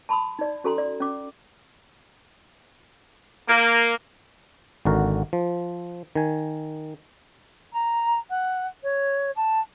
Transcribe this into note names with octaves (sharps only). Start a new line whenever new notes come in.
A5 B5 C6 D#6
D#4 D5
C#4 F#4 A4 G#5 A#5 C6
D5
C#4 D6
A#3
G#1 D3 F#4 A#4
F3
D#3 G#5
A#5
F#5
C#5
A5